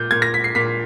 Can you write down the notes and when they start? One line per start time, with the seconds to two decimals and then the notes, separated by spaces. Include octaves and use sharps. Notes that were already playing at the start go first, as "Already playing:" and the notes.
Already playing: A#2 G6
0.11 A#2 G#6
0.22 A#6
0.34 B6
0.44 C7
0.55 A#2 B6